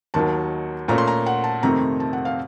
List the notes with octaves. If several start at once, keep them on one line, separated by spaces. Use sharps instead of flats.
D#2 D#3 F#3 A5
A#2 A3 C#4 A#5
C6
A#5
F#5
A5
F2 C3 D#3 A3 C4 A#5
A5
F#5
F5